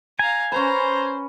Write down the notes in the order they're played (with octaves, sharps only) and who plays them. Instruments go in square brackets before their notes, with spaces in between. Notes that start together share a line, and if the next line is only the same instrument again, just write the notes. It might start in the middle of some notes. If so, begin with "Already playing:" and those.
[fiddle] F5 A#5 [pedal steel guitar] G#5
[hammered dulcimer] C#4 B4 [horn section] C5 [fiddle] A#5